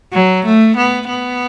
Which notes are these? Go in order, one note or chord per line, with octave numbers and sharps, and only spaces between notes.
F#3
A3
B3
B3